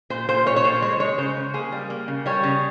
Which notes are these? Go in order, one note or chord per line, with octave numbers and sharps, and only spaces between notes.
A#2 C5
A#2 C5
A#2 C#5
C#5
A#2 C5
G#3 C#5
G#3 C#5
C#3 C5
C#3
A#3 G#4
G3
A#3
C#3
G3 C#5
C#3